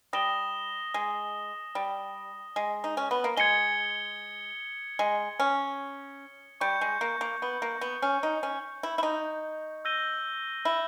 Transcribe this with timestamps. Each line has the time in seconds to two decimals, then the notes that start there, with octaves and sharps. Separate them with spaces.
0.13 G3 D#6 A#6 E7 G7
0.94 G#3
1.75 G3
2.56 G#3
2.84 D#4
2.97 C#4
3.11 B3
3.24 A#3
3.37 G#3 G#6 C#7 G7
4.99 G#3
5.40 C#4
6.61 G3 C#6 G6 C#7
6.81 G#3
7.01 A#3
7.21 A#3
7.42 B3
7.62 A#3
7.81 B3
8.02 C#4
8.23 D#4
8.43 C#4
8.83 E4
8.98 E4
9.03 D#4
9.85 E6 G6 A#6 D#7 G7
10.65 E4